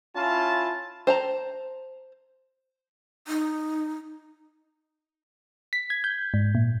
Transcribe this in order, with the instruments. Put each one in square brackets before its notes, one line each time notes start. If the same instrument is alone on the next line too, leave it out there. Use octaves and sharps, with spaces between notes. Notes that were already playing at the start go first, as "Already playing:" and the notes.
[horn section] C#4 E4 F4 A5
[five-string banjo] C5 A5 A#5
[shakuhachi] D#4
[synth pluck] B6
G#6
G6
G#2
A#2